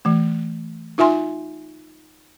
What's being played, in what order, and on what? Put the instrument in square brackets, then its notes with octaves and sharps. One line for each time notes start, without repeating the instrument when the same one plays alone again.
[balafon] E3 A3
D#4 F4 E5 G#5 C6